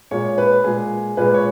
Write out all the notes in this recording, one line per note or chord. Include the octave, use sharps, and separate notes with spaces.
A#2 G#3 C#5
B4
A#2 G#3 G#4
A#2 G#3 B4
C#5